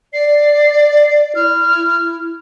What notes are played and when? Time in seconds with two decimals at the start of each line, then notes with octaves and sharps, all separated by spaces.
0.13 D5 C7
1.35 E4 F6